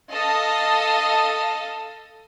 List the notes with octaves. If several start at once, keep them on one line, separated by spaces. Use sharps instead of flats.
A4 D#5 F5